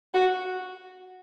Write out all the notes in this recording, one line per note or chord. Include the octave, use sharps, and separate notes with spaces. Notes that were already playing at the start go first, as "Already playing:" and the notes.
F#4